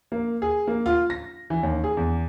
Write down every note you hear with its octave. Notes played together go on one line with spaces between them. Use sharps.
A#3
G#4
A#3
F4
A#6
E3
D#2
G#4
E2